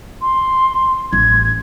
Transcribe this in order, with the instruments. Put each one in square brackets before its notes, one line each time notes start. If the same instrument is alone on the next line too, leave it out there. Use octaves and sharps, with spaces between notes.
[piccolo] C6
[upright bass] A1 [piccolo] G#6